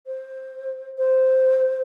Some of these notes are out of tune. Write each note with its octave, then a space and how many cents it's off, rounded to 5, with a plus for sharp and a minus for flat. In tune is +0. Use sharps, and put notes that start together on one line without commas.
C5 +15
C5 -5